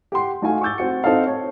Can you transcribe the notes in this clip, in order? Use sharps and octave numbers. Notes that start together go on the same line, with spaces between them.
G4 F#5 C6
A3 D#4 F#4 D#5 F5 G#5
C#6 D6 E6 G6 A6
C4 F#4 C#7
C4 D#4 A4 D#5 F5
C#5 A5